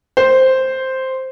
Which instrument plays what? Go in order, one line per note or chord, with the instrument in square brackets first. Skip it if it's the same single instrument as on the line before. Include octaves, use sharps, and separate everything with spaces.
[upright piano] C5